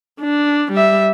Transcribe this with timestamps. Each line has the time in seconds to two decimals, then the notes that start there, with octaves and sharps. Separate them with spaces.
0.21 D4
0.72 G3 E5